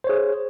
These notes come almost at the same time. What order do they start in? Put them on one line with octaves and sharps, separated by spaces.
C5 C#5 G#4